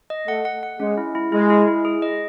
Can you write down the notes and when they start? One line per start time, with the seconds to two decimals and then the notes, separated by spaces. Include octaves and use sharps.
0.10 D#5
0.27 A3 F#5
0.45 F#5
0.63 F#5
0.79 G#3 C#4
0.97 E4
1.15 E4
1.32 G#3 E4
1.50 E4
1.68 E4
1.85 G#4
2.02 D#5